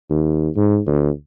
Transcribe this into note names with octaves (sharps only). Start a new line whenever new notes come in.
D#2
G#2
D2